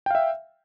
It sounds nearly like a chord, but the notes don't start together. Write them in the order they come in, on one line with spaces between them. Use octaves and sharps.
G5 F5 E5